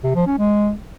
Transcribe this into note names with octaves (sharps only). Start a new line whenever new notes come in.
C3
F3
C#4
G#3